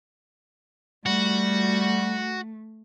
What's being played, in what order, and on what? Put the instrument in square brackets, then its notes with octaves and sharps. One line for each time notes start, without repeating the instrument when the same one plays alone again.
[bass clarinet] G3 [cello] A3 [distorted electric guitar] F#4